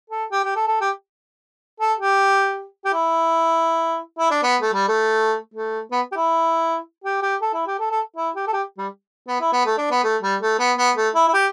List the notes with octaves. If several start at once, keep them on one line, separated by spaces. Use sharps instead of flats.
A4
G4
G4
A4
A4
G4
A4
G4
G4
E4
E4
D4
B3
A3
G3
A3
A3
B3
G4
E4
G4
G4
A4
E4
G4
A4
A4
E4
G4
A4
G4
G3
B3
E4
B3
A3
D4
B3
A3
G3
A3
B3
B3
A3
E4
E4
G4